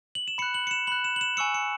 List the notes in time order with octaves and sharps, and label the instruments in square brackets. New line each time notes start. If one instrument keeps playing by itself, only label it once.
[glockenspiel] F#7
E7
B5 F#6 C#7
F#7
C#7
E7
B5 F#6 F#7
E7
F#7
E7
G#5 C#6 E6 C#7
C#7